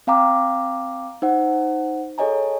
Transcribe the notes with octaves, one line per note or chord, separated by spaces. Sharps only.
C4 F5 G5 A#5 D6
D#4 C5 F#5
G#4 A4 C#5 D#5 G#5 A#5